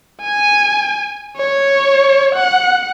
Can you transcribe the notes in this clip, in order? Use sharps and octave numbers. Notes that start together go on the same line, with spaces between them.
G#5
C#5
F#5